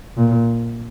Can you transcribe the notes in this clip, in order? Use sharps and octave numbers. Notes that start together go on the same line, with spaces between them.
A#2